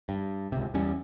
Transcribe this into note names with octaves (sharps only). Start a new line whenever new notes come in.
G2
C#2 C3
E2 G3 C#4